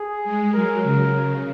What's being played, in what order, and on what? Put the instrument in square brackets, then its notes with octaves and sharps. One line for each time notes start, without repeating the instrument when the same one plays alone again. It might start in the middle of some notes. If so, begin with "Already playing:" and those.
Already playing: [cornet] G#4
[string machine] G#3
[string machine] F#3 [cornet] A#4
[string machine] C#3